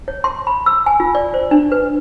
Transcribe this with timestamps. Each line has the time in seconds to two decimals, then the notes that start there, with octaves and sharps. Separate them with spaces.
0.08 C#5
0.24 C6
0.47 B5
0.66 E6
0.86 G#5
1.00 F4
1.15 D5
1.34 C5
1.51 D4
1.72 B4